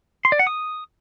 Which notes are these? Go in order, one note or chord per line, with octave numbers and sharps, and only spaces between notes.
C6
D5
F#5
D#6